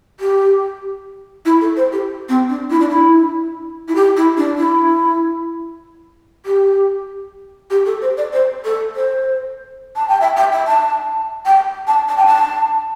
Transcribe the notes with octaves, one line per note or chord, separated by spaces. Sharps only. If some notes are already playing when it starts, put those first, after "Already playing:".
G4
E4
A4
C5
G4
C4
D4
E4
D4
E4
E4
G4
E4
D4
E4
G4
G4
A4
C5
D5
C5
A4
C5
A5
G5
E5
G5
E5
A5
G5
A5
A5
G5
A5